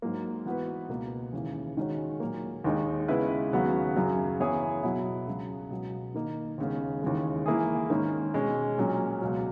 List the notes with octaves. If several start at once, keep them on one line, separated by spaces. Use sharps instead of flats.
G#2 F#3 A#3
E3 B3 F#4 B4
C#2 B2 A#3
D#2 C#3 E3
D#3 G#3 C#4 F#4 C#5
A#2 F#3 A#3
D#2 D#3 G#3 D#4
C#3 G#3 B3 E4 B4
D#2 C#3 F#3 B3 F#4
F#2 C#3 F#3
E3 B3 E4 G#4 C#5
B2 F#3 B3 E4
C#2 C#3 F#3
B2 F#3 B3
D#3 A#3 D#4
D#2 C#3 G#3 B3
D#2 C#3 E3 G#3
E3 A#3 E4 G#4
G#2 D#3 A#3 C#4
B2 G#3 C#4
A#2 F#3 C#4
C#2 B2 F#3